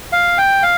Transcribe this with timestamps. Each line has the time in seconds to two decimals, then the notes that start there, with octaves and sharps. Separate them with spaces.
0.12 F5
0.38 G5
0.63 F5